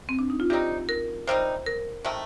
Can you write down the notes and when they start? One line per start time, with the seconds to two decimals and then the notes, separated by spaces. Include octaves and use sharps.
0.09 C4
0.19 D4
0.30 D#4
0.40 F4
0.50 C3 G3 C4 D#4 G4
0.89 A#4
1.27 C3 G3 C4 D#4 C5
1.66 A#4
2.05 C3 D#3 A3